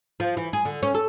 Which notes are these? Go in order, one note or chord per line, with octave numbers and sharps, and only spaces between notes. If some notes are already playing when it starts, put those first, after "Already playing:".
F3
E3
G#4
D3
C#4
A4